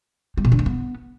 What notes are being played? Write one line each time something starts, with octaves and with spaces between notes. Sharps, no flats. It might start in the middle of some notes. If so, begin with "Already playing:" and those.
G3
B2
D3
A3
B3